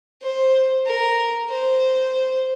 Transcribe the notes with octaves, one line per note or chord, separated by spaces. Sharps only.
C5
A#4
C5